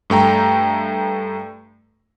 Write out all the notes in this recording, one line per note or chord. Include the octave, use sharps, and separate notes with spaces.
G2 A3 G5 A#5